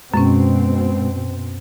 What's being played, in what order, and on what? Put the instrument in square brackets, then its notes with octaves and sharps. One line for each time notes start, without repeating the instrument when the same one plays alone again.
[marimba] F#2 C#4 [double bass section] B2 C4 [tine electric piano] G#3